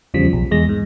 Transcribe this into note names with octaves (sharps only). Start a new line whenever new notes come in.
E2 C#3 F3 G3 B6
B1
E2 G#3 A#6
G#2